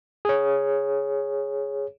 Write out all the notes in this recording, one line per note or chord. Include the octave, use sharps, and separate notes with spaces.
G#4 C#5